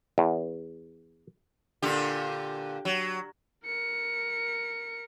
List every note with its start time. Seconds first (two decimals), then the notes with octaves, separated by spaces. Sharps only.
0.18 E2
1.82 A#2 D3 G4
2.85 F#3
3.66 A#4 C#7